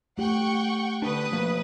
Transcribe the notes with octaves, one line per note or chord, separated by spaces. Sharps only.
A3 G4 F#5 G5 C#6
D3 D4 B4 D#6
B2 F3 A#3